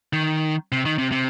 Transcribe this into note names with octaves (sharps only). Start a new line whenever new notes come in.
D#3
C3
D#3
C3
C3